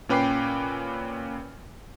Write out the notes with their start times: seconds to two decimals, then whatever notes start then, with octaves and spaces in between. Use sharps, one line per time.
0.09 A#2 C#4 B4 G5 D6 C7